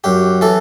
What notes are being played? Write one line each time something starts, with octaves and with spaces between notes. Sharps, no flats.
F#2 G4
E3 A4